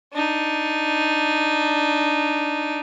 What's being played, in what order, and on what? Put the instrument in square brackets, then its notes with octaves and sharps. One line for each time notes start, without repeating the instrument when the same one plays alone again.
[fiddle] D4 D#4